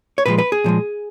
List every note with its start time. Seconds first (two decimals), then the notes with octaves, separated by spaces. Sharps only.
0.18 C#5
0.26 A#2 F3 G#3 B4
0.38 B4
0.52 G#4
0.64 A#2 F3 G#3